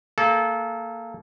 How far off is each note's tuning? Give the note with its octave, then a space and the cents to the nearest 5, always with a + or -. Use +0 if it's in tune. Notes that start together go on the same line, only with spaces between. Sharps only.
A#3 -20 A4 -25